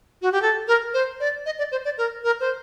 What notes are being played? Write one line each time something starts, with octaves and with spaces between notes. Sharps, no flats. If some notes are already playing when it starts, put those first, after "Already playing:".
F#4
G4
A4
A#4
C5
D5
D#5
D5
C5
D5
A#4
A#4
C5